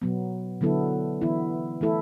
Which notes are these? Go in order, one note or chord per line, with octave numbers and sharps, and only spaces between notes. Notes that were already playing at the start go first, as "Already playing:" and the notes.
B2 F#3 B3
D3 F#3 B3 E4 A4
E3 B3 E4
E3 A3 E4 A4